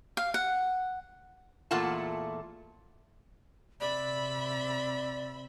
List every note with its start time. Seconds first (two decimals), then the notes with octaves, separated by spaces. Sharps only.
0.17 F5
0.34 F#5
1.71 E2 A#2 A3 F4 F#5 A5
3.81 C3 C4 D5 E5 B5